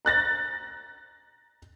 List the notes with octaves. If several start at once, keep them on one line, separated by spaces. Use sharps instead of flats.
A#5 F#6 A6 A#6